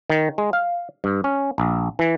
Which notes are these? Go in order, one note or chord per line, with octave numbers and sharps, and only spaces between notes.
D#3
G#3
F5
G2
C#4
A#1
E3